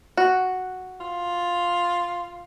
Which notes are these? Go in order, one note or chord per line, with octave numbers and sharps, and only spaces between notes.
F#4
F4